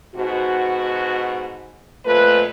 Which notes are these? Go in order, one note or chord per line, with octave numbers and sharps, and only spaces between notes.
G#2 B2 F#4
F2 A#2 A3 B4